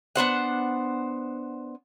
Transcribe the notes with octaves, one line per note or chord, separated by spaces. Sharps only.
B3 D4 C5 F#5